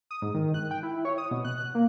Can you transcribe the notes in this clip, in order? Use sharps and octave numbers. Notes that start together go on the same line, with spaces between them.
D#6
G#2
D#3
F#6
G5
E4
C#5
D#6
B2
F#6
F#6
A#3